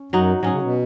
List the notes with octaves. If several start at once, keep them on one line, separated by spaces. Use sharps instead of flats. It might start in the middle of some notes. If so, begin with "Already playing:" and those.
Already playing: C#4
F#2 F#3 D#4 F#4
G#2 F#3 C#4 G#4
C#3
B2